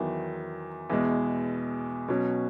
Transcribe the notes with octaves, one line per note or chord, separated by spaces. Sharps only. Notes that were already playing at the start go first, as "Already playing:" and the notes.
Already playing: E2 D#3 F#3
E2 B2 G#3
B2 F#3 C#4